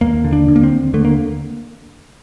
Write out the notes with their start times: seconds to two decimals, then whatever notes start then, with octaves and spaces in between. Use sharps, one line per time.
0.01 D#2 A#3
0.24 D3
0.33 D4
0.48 D3
0.56 A#3
0.63 C4
0.72 D#2
0.94 D3 A3
1.05 A#3